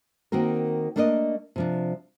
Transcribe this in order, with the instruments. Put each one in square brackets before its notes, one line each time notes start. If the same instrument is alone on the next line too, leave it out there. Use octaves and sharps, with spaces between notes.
[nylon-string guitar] D#3 A#3 C4 F#4 A#4
A3 A#3 D4 A#4 D5 D#5
C3 F3 D4